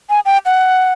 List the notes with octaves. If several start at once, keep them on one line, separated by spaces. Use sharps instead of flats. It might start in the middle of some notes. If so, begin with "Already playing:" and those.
G#5
G5
F#5